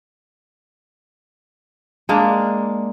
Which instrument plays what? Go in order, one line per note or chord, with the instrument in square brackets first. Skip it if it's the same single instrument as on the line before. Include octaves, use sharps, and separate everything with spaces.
[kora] G#3 A#3 D4